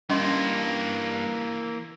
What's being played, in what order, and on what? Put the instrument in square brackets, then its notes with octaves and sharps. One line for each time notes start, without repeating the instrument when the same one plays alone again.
[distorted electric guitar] G2 [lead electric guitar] E3 A#3 [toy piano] C#4 D#5 C6